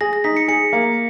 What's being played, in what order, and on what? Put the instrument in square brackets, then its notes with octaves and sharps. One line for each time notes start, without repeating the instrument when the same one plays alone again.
[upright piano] G#4 [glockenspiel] A#6
[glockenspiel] A#6
[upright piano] D#4 [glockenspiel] B6
[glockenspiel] C#7
[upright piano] G#4 [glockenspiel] C#7
[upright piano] A#3